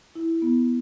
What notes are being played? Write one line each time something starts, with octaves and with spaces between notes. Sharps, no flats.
E4
B3